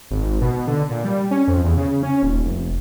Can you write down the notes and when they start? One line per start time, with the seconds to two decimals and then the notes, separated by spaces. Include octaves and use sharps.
0.11 G#1
0.41 B2
0.67 D3
0.90 A#2
1.04 G3
1.31 C#4
1.48 F2
1.64 E2
1.77 C#3
2.03 C#4
2.23 D#1
2.45 F1